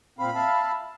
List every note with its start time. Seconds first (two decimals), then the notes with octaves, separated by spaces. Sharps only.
0.19 A#2 C4 F5 B5
0.35 E5 F5 A5